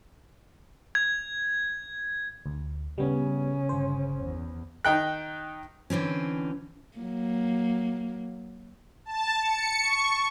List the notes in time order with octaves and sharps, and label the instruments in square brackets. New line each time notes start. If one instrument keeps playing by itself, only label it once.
[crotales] G#6
[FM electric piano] D2
[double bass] C#3 C#4 [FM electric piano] G3 B3
[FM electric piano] G1 C5
[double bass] E2
[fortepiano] D#3 D#4 G5 F#6
[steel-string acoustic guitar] D3 E3 C4 C#4
[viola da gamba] F#3 A#3
[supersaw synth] A5
C#7
C#6